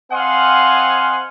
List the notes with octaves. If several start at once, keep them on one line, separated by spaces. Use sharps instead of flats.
C4 D#5 F5 F#5 G#5 C6